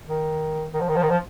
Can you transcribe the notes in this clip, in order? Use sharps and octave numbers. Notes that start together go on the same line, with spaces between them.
D#3
D#3
F3
D#3
F3
D#3
F3